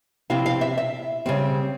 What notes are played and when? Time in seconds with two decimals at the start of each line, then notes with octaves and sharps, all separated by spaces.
0.30 C3 F3 C4 E4 F5
0.46 F5
0.61 E5
0.78 E5
1.26 C#3 G3 C4